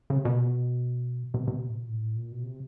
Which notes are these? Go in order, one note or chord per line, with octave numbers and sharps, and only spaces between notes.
C#3
C3
B2
C3
C3
B2
A2
A#2
A2
A#2
B2
C3